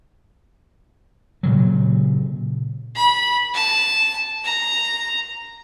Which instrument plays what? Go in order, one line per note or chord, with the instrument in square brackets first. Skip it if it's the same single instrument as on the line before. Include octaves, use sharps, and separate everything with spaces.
[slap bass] A#2 C#3 F#3
[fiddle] B5
A5
A#5